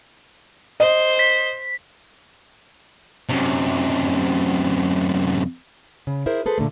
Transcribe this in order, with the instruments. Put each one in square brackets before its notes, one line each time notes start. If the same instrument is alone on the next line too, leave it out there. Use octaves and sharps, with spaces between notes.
[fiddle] C5 [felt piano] D#5
[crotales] B6
[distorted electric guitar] F#2 C3
[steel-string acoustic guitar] C#3
E4 G#4 A#4 C5
G#4 A4 B4 C5
A#2 D3 D#3 A3